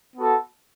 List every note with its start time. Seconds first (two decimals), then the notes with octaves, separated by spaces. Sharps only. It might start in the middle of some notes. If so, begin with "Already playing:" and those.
0.16 B3 F#4 A4